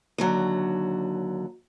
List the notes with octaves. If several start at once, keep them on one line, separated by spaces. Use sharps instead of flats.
D#2 D3 F#3